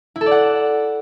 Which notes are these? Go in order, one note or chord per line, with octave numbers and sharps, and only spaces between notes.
E4
A4
D5
F#5